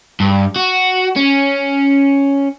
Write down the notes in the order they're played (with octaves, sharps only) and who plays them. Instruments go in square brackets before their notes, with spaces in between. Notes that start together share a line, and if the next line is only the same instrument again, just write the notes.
[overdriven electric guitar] G2
F#4
C#4